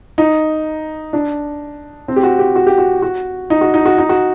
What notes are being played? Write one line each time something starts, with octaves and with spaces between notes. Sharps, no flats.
D#4
D4
C4
G4
F#4
G4
F#4
G4
F#4
F#4
D#4
F#4
D#4
F#4
D#4
F#4